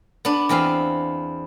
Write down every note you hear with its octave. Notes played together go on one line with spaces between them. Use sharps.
B3 D4
E2 B3 C4 F5